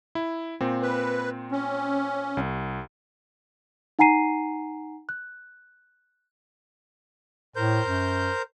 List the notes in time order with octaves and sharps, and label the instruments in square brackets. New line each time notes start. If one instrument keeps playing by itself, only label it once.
[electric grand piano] E4
A#2 C4
[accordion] B4
C#4
[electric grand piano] C2
[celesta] D#4 F#5 G#5 A#5 C7 D#7
F#6
[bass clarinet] A2 [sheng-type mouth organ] A#4 C5 G6
[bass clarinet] F#2